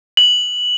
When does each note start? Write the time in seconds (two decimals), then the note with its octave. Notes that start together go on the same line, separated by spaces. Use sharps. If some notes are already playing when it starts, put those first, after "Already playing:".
0.17 F#7